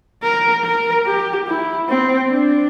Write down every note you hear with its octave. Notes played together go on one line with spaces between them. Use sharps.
A#4
A#4
G4
E4
C4
D4